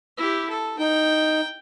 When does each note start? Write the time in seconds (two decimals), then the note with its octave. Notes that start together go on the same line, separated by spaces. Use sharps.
0.17 E4 G4
0.49 A4
0.79 D#4 G5